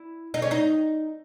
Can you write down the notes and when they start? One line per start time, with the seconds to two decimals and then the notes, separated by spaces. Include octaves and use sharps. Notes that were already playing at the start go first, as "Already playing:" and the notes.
Already playing: E4
0.34 D#4
0.42 C#4
0.51 D#4